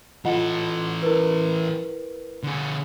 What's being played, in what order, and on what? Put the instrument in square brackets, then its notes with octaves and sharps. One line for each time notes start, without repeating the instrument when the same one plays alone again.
[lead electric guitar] E3 A4 [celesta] F4 D#5 F#5
[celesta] E4 A#4 B4
[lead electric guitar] D3 G#4